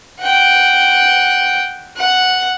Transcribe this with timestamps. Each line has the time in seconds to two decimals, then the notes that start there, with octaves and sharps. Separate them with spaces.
0.20 F#5 G5
1.96 F#5